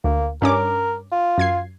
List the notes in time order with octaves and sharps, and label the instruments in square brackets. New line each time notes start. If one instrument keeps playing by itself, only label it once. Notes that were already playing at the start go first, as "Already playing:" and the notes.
[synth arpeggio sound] D2 [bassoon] A#3
[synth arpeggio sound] G2 C#4 D6 [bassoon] A#4
[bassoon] F4
[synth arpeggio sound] F#2 G#6 C7